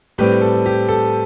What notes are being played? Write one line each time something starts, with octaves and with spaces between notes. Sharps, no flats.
A2 G3 C4 G4 B4
A4
G4
A4